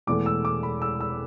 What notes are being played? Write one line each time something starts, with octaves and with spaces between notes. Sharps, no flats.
E1 E2 E3 A3 D6
E6
D6
B5
E6
E6